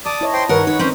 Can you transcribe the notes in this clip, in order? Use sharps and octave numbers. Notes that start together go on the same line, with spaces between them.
D5 A5 D6 D#6
E4 C#5 D#5
C5 G5 C6
G2 D#3 A#4 B4 C#5 F#5
D#4 C#5
C4 C#4 C5